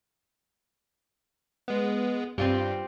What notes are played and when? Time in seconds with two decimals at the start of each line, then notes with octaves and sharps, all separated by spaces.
1.68 G#3 B3
2.38 G2 C4 F4 G4